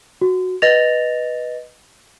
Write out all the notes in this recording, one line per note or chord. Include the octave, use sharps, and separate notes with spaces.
F#4
B4 D#5 A6 A#6 F7